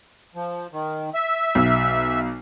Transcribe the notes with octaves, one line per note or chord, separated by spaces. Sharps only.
F3
D#3
E5
B1